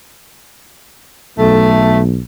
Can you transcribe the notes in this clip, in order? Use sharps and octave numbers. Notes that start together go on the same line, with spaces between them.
B1 A3